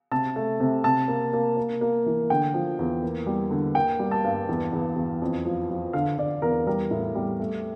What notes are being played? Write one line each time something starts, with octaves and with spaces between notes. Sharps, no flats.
C3 A5
A3
C3
C3 A5
A#3
A#3
A#3
A#3
E3
D3 G5
F3
E2
A#3
G3
D3
A#3 G5
G3
A5
G2
E2
E2
E2
F2
F3
F3
D3 F5
D3 D5
E2 A#4
G3 A#4
A2
G3
A3